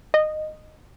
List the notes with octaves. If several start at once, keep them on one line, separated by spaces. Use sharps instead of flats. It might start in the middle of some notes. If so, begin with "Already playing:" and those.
D#5